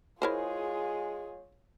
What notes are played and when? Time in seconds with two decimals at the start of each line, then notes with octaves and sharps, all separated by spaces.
0.22 G#3 E4 F4 G#4 A#4 C5 C#5